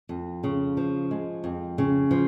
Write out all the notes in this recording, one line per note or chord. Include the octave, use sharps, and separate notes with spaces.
F2
C#3
F3
G#3
F2
C#3
F3